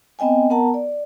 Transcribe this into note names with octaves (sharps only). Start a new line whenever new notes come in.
B3 C4 D#5 G5 G#5
B3 A#4 F#5 A5 A#5
D5